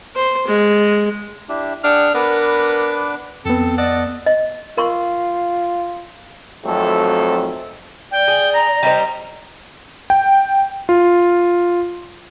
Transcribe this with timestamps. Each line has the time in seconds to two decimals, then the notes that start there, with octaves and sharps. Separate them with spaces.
0.16 C5
0.47 G#3
1.49 D4 E4 G4
1.84 D4 G#4 F#5 G5 F6
2.15 B3 D4 A#4 B4 D6
3.45 F2 B3 C4 A4
3.78 D5 D#5 F#5 A5 E6
4.26 D#5
4.77 F4 A#4 C6 C#6
6.64 G#1 F2 F#3 A3 C4 A4
8.11 D5 G5
8.28 G#4
8.54 A#5 A#6
8.83 G3 D#4 C5
10.10 G5
10.89 F4